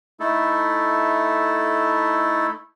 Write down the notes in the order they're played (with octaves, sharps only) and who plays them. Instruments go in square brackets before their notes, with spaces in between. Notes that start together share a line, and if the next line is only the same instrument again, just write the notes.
[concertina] A3 D#4 E4 A4